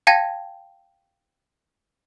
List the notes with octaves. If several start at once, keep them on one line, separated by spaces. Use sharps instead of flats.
F5 G5 A5 G#6 A#6